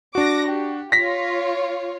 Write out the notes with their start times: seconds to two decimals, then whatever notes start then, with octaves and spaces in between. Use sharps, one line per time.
0.15 D4 F#4 D6 A#6
0.47 G4
0.92 F4 C#5 A#6 B6